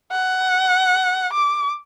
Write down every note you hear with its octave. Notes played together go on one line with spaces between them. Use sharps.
F#5
D6